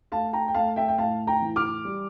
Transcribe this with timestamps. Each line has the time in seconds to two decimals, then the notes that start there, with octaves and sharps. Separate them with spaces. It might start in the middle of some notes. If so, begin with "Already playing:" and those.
0.12 A3 F5 A5
0.33 G5 A#5
0.48 G5
0.55 A3 F5 A5
0.76 E5 G5
0.88 G5
0.98 A2 F5 A5
1.27 G5 A#5
1.42 E3
1.56 D6 F6
1.85 G3